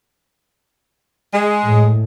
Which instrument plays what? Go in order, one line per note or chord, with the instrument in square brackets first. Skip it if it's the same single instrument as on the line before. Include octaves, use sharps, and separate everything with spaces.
[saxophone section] G#3
[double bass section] A2